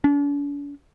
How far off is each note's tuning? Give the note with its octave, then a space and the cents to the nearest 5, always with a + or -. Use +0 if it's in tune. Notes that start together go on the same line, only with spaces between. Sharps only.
D4 -45